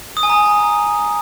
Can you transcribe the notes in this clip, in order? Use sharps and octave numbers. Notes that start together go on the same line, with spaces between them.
D#6
G#5
A#5